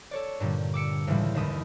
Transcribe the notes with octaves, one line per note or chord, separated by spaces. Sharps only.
A4 C#5 D5
G2 A#2 D3 G3
D6 E6 C#7 D7
C#2 A2 C#3 E3 G3
G1 D#2 E4 D#6